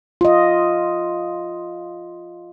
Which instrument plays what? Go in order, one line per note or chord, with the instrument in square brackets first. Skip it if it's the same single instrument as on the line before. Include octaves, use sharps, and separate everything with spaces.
[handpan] F4 D#5